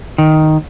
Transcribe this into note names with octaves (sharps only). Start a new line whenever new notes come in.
D#3